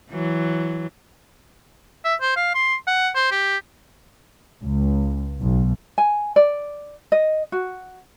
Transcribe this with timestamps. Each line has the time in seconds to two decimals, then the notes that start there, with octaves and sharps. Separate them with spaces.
0.11 E3 F#3
2.05 E5
2.21 C5
2.36 F5
2.55 C6
2.87 F#5
3.15 C5
3.31 G4
4.64 C#2
5.41 B1
5.98 G#5
6.36 D5
7.12 D#5
7.52 F#4